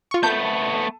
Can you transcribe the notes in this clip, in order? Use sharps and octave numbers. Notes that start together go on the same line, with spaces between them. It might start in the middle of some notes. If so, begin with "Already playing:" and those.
F4 C#6
A3 B3 A4 A5 G6